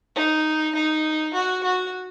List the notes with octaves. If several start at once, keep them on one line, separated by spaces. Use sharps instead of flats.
D#4
D#4
F#4
F#4